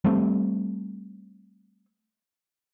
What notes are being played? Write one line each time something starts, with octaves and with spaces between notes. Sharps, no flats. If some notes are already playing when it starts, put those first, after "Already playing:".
G3 A3 C4